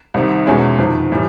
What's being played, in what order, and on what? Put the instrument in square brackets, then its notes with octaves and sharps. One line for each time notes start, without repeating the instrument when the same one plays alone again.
[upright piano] C2 C3 D#3
E2 B2 G#3 C#4 E4
F2 C3 D#3
A2 E3 G3